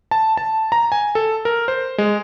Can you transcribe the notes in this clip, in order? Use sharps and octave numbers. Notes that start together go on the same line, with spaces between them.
A5
A5
A#5
G#5
A4
A#4
C5
G#3